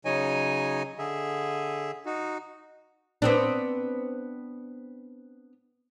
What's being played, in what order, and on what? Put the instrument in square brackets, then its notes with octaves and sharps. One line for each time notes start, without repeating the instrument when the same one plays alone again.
[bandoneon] C#3 F#3 D#4 C#5 D#5 G#5
D3 G#4 E5
D#4 F#4
[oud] B3 C4 D4